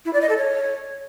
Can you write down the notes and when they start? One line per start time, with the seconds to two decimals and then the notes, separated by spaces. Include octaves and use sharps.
0.05 E4
0.13 D5
0.21 D#5
0.29 A4
0.37 C#5